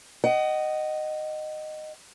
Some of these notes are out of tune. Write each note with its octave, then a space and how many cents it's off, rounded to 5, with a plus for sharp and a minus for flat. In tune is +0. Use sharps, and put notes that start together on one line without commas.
D#5 -10 F#5 +30